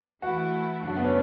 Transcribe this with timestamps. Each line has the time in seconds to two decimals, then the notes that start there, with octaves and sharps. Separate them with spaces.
0.22 E3 A3 E4 F#4
0.83 F#2 C#3 F#3 A3 D4 F#4
0.96 B3
1.04 C#4